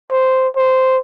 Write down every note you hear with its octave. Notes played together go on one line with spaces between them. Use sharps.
C5
C5